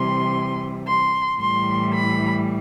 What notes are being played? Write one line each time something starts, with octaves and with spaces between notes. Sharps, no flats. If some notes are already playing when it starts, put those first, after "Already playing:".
Already playing: C3 E3 G3 C6
C6
A2 E3 G3 C6
B5